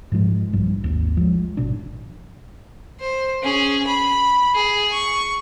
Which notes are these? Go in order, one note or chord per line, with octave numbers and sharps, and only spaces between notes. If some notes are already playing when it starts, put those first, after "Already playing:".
G#2 F3 G#3
B1 G2 F3 G3
G#1 D#2
F3 F#3 G#3
G#1 B2 D4
C5
C#4 G#4
B5
G#4
C#6